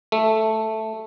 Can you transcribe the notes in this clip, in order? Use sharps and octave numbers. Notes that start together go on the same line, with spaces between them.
A3